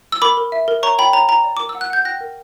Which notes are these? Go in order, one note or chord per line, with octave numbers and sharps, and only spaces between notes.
E6
A#4 B5 D6
A#4
E5
A#4
C#5 A#5 C#6
C#5 G5 B5
C#5 A#5
G5 A#5
D5
A#4 D6
E6
F#5
F#6
F#5 G6
G5 F#6 A#6
A#4